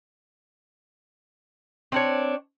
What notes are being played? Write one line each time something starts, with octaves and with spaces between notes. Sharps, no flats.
C4 D4 C#5